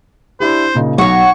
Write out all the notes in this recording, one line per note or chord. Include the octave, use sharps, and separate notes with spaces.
D4 E4 G4 C5
A#2 C#3 D#4
B1 F#4 C#5 C#6